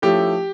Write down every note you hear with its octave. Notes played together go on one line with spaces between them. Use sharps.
F3 A3 C#4 E4 G4